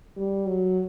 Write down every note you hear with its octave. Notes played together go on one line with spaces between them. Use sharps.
G3
F#3